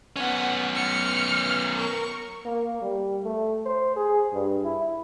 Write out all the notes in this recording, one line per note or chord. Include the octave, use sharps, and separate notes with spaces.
B3 C#4 F#5
F6 C#7
A#4 C#6
A#3
G3
A3
C5
G#4
G2
E4